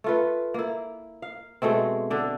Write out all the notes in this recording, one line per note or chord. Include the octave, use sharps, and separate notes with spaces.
A3 F4 B4
A#3 E4
F5
B2 G#3 A3 C4
D3 D4